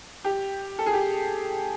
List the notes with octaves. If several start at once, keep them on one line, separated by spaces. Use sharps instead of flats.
G4
A4
G#4
G4